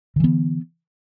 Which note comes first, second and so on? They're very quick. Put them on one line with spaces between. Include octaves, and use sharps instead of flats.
D3 E3 B3